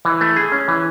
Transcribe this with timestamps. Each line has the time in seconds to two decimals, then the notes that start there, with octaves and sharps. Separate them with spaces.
0.05 E3
0.21 A3
0.36 G#4
0.52 C#4
0.68 E3